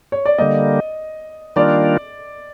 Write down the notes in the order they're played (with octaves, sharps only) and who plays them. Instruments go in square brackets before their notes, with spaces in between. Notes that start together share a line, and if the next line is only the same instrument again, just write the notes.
[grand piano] C#5
D5
[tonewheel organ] D3 G3 A#3 [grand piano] D#5
[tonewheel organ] D#3 G3 A#3 D4 F4 [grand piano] D5